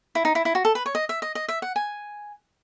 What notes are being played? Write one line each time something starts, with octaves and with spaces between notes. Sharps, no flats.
E4
D#4
E4
E4
F#4
A4
B4
C#5
D#5
E5
D#5
D#5
E5
F#5
G#5